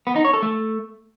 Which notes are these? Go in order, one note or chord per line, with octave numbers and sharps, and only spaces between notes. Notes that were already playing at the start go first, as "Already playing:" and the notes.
B3
D#4
C#5
A4
A3